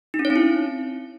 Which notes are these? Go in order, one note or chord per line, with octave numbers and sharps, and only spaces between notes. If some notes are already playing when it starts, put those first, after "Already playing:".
D#4
C#4
C#5
C4
E4